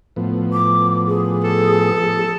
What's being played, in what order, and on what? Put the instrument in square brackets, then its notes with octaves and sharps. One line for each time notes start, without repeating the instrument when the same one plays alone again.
[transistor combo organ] A2 F3 B3
[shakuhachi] D6
G#4
[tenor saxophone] A4
[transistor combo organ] F3